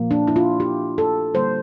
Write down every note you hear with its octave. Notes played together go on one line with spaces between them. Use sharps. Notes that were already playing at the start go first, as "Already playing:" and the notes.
Already playing: A#2 F3 A#3
D4
E4
F4
G4
A4
D3 G3 A#3 C5